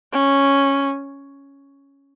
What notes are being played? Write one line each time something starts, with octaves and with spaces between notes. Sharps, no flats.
C#4